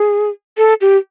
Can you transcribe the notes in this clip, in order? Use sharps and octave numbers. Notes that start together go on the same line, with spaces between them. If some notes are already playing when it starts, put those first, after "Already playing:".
Already playing: G#4
A4
G4